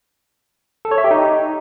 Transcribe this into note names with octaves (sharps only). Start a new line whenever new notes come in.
A4
C#5
E5
G4
D#4